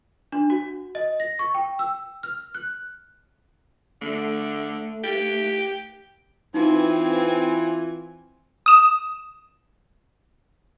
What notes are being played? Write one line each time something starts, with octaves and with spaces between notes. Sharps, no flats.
D4
F#4
D#5
A#6
C#6
G5
E6
F6
F#6
D3 A3
G4
E3 C4 D#4 F4 G#5
D#6 E7